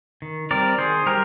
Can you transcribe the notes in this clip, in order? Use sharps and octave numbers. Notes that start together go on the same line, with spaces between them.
D#3
G3 C4 A#4 D5
D#3 G#4 C5
G3 G4 A#4